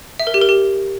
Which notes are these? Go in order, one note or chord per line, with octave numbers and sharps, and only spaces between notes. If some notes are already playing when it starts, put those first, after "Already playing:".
E5
A#4
G4
A#4
G4